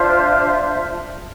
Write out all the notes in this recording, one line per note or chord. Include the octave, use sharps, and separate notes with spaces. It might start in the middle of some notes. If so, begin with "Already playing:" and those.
Already playing: D4 F4 C5 E5